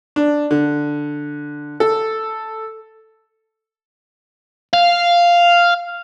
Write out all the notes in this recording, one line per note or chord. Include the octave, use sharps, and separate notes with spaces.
D4
D3
A4
F5